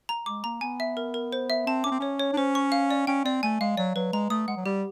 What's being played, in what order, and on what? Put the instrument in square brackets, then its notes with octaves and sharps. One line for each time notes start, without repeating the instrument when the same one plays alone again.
[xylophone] A#5
[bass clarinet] G#3 [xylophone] D6
[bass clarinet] A#3 [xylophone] A#5
[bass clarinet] B3 [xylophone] G#5
[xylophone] E5
A#4
A#4
C5
E5
[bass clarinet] C4 [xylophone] A5
[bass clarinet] C#4 [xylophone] D6
[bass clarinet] C4
[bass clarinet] C#4 [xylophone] C#5
[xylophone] C#5
[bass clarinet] D4
[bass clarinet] C#4 [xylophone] C5
[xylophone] C#6
F5
D5
[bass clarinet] C#4 [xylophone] G5
[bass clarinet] C4 [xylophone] D5
[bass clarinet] A3 [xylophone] G#5
[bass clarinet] G#3 [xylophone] F5
[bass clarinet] F#3 [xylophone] D5
[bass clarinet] F#3 [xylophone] B4
[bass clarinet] G#3 [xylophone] A#5
[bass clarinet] A3 [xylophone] D#6
[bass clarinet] G#3 [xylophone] F#5
[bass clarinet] F#3
[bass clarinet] G3 [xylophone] G4